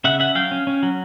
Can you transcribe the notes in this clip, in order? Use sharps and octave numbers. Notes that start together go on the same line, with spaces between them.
C#3 E5 F#5
C#4 E5 F#5
F#3 F5 G5
C#4
C#4
F#3